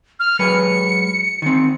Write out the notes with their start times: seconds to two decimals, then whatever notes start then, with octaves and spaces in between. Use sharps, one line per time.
0.20 F6
0.39 F#3 G#3 B4 C#7
1.42 D#3 C4